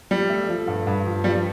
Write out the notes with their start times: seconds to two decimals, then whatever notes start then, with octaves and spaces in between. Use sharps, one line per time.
0.11 F3 G3
0.29 A3
0.49 F3
0.68 G2
0.87 G2
1.05 F3
1.24 F3 G3